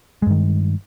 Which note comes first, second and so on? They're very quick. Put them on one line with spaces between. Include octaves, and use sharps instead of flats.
G#3 G2 D#3